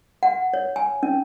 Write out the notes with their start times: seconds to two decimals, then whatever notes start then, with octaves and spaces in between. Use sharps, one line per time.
0.23 F#5
0.54 C#5
0.76 G#5
1.03 C#4